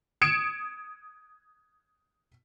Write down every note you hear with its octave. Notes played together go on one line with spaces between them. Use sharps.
D#6 G#6 C#7 D7 E7